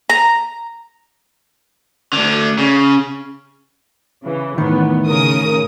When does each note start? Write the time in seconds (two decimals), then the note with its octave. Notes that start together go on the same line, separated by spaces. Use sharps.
0.10 A#5
2.13 D2 D3
2.58 C#3
4.24 C#3 E3
4.58 E2 A2 D#3 B3
5.07 C#3 A#4 D#6